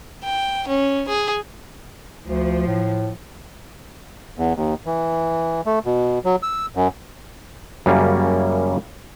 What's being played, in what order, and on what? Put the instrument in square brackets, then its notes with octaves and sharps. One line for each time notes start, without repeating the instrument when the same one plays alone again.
[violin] G5
C#4
G#4
[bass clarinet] D2 [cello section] F3
[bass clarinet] A2
[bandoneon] E2
D#2
E3
A3
B2
F#3
E6
F#2
[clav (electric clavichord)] F#2 C#3 G3 A#3 C#4